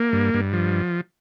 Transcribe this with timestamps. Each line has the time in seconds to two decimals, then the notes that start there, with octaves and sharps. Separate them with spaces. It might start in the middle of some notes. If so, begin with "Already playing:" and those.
Already playing: A#3
0.13 G2
0.34 G2
0.53 F3